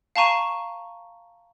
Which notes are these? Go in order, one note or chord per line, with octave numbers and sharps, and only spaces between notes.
F5 A5 A#5 C#6 D#7